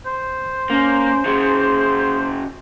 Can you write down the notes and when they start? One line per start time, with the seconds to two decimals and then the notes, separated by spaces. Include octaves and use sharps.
0.06 C5
0.70 A#3 C#4
1.26 C#3 F#3 G#4